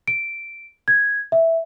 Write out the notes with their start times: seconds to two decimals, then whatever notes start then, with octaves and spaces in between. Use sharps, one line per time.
0.08 D7
0.88 G#6
1.32 E5